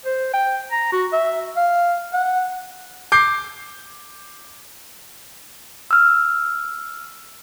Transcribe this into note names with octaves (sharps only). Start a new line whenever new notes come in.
C5
G5
A#5
F#4
E5
F5
F#5
D6 G6 C7
E6 F6